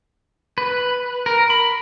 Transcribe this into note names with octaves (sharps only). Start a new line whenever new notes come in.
B4
A#4
B5